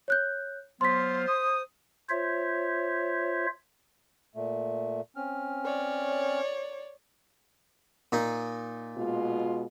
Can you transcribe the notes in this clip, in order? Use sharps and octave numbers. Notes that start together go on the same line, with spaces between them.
C#5 F#6 G6
F#3 B3 F4 C5 C6 B6
D#6
F4 C5 C#5 E5
A#2 A3
C4 C#4 F6
C#5 D5
A#2 D#4
B2 G#3 F4